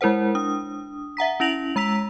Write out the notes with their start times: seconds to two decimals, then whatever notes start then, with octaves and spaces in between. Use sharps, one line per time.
0.01 G#3 E4 A#4 C5 F#5
0.35 D4 D#6
1.17 E5 F#5 A#5 B6
1.40 C#4 E4 A#6 D7 F7 F#7
1.76 G#3 A#5 E6 B6 F7